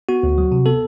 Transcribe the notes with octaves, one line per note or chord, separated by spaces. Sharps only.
B3 F#4
D2
F#3
C3
B3 A4